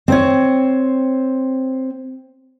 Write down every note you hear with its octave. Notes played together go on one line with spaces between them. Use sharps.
C4 C5 C#5